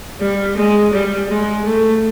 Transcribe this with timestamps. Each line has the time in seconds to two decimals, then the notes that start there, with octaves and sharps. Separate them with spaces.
0.20 G3
0.57 G#3
0.93 G3
1.29 G#3
1.65 A3